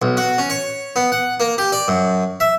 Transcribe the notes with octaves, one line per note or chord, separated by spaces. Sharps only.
B1
F#4
C#4
C#5
B3
F#5
A#3
G4
D5
F#2
E5